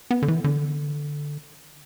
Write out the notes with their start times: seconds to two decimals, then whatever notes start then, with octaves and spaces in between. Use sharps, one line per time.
0.11 B3
0.22 D3
0.28 E3
0.44 D3